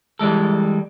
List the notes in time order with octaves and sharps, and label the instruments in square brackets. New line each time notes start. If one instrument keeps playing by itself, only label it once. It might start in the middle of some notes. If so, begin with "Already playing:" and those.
[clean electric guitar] E3 G3 G#3 A4